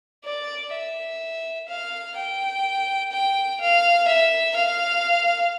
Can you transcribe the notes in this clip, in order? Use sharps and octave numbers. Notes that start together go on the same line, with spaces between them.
D5
E5
F5
G5
G5
F5
E5
F5